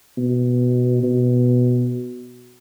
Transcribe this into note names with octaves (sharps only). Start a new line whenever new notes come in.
B2
B2